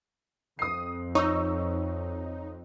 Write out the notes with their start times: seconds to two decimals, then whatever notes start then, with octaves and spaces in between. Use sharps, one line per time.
0.59 F2 D#6 C7
1.15 D#4 C#5 C#6 E6